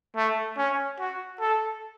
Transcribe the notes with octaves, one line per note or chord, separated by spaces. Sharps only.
A3
C#4
F#4
A4